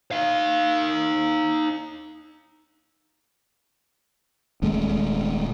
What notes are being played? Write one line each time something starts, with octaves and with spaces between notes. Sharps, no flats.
D#4 F5
D#1 D#2 G#3 A3